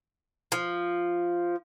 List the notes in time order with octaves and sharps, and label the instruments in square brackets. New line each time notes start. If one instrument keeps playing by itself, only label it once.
[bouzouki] F3